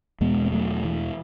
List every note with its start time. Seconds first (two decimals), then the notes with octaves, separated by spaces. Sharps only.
0.21 E2 B2 G#3 B3
0.46 B3
0.52 F#3 A3
0.85 E3